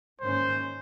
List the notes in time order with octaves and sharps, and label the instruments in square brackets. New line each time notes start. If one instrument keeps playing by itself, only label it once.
[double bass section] G#2 D#3 A#3 C#4 [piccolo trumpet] C5